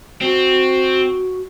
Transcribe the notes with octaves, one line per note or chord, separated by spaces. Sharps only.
C4 F#4